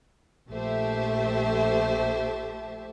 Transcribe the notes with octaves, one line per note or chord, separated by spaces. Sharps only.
A#1 A3 G4 C5 E5 A5